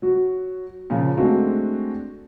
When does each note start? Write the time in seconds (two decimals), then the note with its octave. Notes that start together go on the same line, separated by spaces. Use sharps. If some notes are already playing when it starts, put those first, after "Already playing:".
0.02 F#3 F#4
0.90 A#2 C#3 F3
1.17 G#3 A3 C4 D4 F#4